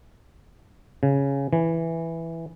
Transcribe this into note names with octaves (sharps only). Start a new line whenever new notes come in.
C#3
E3